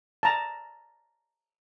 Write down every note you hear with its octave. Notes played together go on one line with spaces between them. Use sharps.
A5 A#5